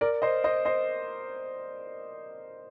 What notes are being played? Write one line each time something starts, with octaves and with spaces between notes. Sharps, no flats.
A#4 D5
C5 D#5
C5 D#5
C5 D#5